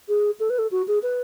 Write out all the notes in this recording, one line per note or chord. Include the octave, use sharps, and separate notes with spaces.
G#4
A4
B4
A4
F#4
G#4
B4